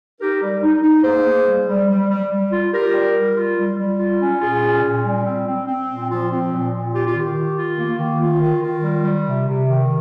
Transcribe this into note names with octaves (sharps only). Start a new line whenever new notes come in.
D#4 G4 A#4
G3
D#4
D#4
A#3 G#4 C5
A#3
G3
G3
G3
G3
G3
F4
F4 G4 A#4
G3
G3
F4
G3
G3
F4
C#4
A#2 F4 G#4
C#4
A#2
G3
C4
C4
C4
A#2
F3 F4
C4
A#2
A#2
F4 G4
F4
D#3 G4
D#3
F4
A#3
D#3
F4
D#3
D#3 F4
G3
G3
C3
C3
D#3